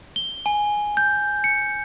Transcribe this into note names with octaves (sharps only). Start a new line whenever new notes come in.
G7
G#5
G6
C#7